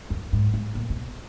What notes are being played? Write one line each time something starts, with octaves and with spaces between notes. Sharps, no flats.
F#2
G#2
G#2
A#2
B2